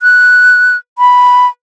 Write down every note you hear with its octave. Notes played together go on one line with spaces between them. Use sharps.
F#6
B5